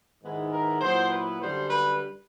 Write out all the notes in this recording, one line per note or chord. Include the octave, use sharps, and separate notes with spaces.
G#2 D#3 G#3 B3 E4
A#4
A#2 F#3 B3 E4 C5
B4
F#2 D3 G3 C5
B4